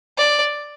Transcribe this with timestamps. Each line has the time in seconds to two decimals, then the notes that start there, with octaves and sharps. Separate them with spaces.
0.18 D5